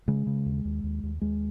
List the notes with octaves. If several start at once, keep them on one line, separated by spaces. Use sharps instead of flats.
C#3 G#3
C#3
D#2
D#2
D#2
D#2
D#2 G#3